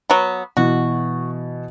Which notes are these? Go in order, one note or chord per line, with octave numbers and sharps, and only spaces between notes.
F#3 B3
B2 E3 F#4